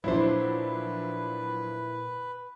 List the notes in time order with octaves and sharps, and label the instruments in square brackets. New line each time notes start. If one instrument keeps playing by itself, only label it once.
[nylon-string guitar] A#2 C5 [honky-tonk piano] F3 F#3 D4 [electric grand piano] E4 [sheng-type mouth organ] B4